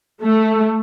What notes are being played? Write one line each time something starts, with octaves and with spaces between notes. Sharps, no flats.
A3